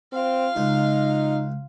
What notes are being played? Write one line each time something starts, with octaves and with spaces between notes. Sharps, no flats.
C4 F4 F5
C#2 G#3 D#4